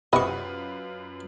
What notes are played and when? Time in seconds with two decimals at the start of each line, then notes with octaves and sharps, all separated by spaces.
0.13 F#2 C3 F4 F#4 B4 D#5 B5 C#6